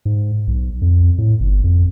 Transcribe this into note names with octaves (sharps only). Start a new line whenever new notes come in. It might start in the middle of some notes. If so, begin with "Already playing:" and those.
G#2
B1
F2
A2
G1
F2